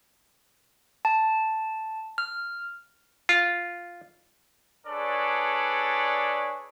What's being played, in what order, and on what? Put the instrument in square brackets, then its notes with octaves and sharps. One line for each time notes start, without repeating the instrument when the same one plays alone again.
[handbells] A5
F6
[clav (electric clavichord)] F4
[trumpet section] D4 G#4 A4 B4 C#5 D5